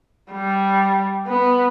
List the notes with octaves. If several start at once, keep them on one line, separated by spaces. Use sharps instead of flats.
G3
B3